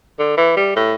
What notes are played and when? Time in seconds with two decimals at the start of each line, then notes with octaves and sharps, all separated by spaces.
0.19 D3
0.37 E3
0.56 G3
0.76 A2